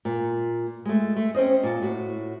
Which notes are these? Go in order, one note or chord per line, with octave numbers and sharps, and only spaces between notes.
A#2
G#3 A3
A3
C4 C#4 C5 D#5
A#2 A5
A2 F#4